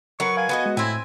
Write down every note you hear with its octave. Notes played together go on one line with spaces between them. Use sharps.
F#3 A#4 B4 C#6
F5 G#5
B3 F#4 D#5
G#3
A2 C4 E4 G#5